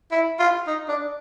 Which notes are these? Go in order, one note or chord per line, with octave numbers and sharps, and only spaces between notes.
E4
F4
D#4
D4